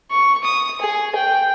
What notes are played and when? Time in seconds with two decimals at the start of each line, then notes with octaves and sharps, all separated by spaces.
0.11 C#6
0.44 D#6
0.81 G#4
1.16 G5